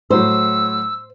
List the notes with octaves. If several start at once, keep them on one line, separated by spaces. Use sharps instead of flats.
A2 F#3 C5 E6